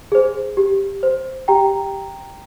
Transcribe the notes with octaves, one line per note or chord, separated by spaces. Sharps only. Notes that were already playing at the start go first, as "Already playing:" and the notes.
G#4 C5
G4
C5
G4 G5 A#5